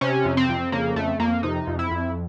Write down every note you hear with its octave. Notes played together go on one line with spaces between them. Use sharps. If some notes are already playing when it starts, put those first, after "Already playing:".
C3 C#4
F2
C4
F2
C#3 A#3
F2 A3
F2 A#3
C3 D#4
F2
E4
F2